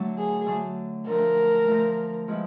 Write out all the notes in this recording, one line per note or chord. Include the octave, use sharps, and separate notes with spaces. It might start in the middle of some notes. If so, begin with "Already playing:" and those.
Already playing: D3 F#3 A3 D4
G#4
D3 F#3 A3 D4
D3 F3 A3 A#4
D3 F3 A3
F3 G#3 B3 E4